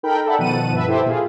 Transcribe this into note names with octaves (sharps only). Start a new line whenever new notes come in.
D#4 A4 A#4 G5 B5
A4 D5 E5 F#5 B5
B2 D#3 F3 F#5 A5 D#7
G2 B4 E5
E4 G4 A4 C5 E5
A#2 F4 G#4